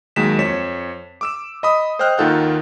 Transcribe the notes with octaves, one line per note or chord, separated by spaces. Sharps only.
D#2 F#3 G#3 B6 E7
F2 C#5 B6 E7
D6 E6 E7
D#5 B5 D#6
C5 D#5 G5 F6 F#6
D#2 D#3 F4 A4 F#5 G6